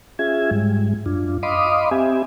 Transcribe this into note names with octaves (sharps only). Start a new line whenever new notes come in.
C#4 F4 G#4 E5 G#6
G#2 G3 G#3
F#2 D4 F4
D#5 F5 B5 C6 D6 D#6
C4 G4 E5 G#5